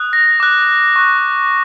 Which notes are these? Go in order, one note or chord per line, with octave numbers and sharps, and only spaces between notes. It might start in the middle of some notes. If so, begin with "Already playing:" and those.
Already playing: D#6 F#6
A#6
D6 F#6
C#6 F#6